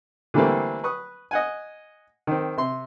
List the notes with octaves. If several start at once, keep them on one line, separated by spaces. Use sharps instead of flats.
D3 E3 G3 A3 A#3 C4
B4 C#6 D#6
D#5 F#5 G#5
D#3 C4
C3 C6